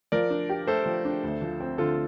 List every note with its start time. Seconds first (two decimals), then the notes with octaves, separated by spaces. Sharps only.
0.12 F3 A#4 D5
0.30 D4
0.49 G4
0.67 A3 A4 C5
0.86 F3
1.05 D4
1.24 D2
1.42 F3
1.60 C4
1.78 D3 F4 A4